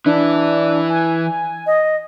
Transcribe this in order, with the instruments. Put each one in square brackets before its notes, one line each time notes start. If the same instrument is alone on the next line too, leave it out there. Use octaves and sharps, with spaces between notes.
[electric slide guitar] E3 E4 [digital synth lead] D4
[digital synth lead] G#5
[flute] D#5